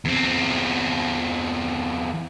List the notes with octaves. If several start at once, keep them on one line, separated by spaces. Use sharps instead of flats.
E2 C4